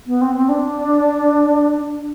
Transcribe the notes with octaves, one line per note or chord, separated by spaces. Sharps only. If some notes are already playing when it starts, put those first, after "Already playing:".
B3
C4
C4
D4